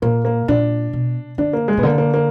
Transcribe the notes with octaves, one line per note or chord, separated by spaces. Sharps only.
A#2 A#3
A#3
A#2 D4
B2
D3 D4
A#3
G#3
B2 B3
D3 A#3
A#3
A#3